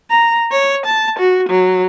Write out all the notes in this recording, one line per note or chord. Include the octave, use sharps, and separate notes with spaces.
A#5
C#5
A5
F#4
F#3